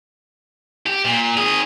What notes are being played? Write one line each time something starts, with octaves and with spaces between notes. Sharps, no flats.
G4
A#2
D#3 G#4